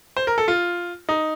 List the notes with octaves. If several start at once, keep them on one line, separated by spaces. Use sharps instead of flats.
C5
A#4
A4
F4
D#4